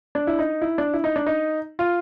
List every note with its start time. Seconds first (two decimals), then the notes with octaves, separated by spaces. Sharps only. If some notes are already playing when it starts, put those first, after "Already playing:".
0.15 D4
0.27 E4
0.39 D#4
0.62 E4
0.78 D4
0.94 E4
1.04 D#4
1.16 D4
1.26 D#4
1.79 F4